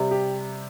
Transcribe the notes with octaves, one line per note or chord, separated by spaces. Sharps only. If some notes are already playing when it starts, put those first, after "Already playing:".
Already playing: C3 G3
G4